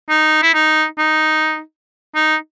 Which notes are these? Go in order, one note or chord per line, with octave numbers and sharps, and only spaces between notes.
D#4
E4
D#4
D#4
D#4